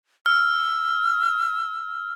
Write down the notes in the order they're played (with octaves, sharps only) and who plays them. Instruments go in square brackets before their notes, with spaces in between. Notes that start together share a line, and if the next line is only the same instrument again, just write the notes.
[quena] E6 [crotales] F6